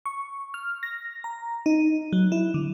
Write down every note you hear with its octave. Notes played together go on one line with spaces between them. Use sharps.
C#6
F6
A#6
A#5
D#4
F#3
E4
D3